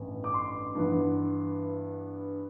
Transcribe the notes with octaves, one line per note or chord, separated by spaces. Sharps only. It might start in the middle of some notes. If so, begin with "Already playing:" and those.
Already playing: A1 G2 E3 B3
D6
C6
G2 E3 B3